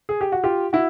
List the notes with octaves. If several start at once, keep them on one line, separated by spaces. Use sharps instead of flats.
G#4
G4
F#4
F4 G4
E4 F#4